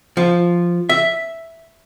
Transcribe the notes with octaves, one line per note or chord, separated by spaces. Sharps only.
F3
E5